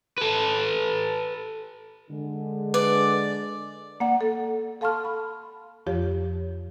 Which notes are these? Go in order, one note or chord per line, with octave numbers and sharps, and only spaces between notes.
A4 B4
D3 G#3
B4 D5
A#3 D5 F#5
A4
A4 F5 A5 C6 C#6 F6
B5
F2 F3 F4 G4 C#5